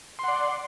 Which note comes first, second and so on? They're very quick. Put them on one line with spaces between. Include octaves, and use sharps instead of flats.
C6 F#5 D5